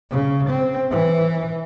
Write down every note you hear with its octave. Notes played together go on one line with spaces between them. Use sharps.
C#3
C4
E3